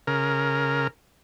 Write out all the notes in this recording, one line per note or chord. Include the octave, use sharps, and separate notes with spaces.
C#3 A#4